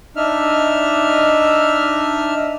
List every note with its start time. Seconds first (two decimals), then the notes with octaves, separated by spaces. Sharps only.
0.16 D4 D#4 E5 F6